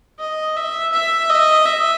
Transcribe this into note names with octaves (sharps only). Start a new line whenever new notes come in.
D#5
E5
E5
D#5
E5